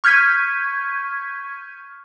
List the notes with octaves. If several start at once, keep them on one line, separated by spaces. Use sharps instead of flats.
C#6 F6 G6 G#6 B6 D#7